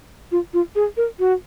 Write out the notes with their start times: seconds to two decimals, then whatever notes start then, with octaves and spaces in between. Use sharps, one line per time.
0.32 F4
0.54 F4
0.75 G#4
0.97 A#4
1.20 F#4